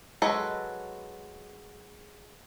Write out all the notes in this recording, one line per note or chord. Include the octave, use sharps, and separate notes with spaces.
F#3 G#3 A4 B4